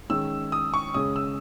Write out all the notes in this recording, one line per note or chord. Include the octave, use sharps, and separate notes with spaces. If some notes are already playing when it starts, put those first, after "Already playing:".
D#3 G#3 C#4 E6
D#6
C#6
C#3 G#3 C#4 D#6
E6